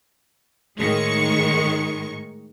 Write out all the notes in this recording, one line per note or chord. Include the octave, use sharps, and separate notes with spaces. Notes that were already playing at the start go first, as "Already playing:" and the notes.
A2 D#3 G#3 C#6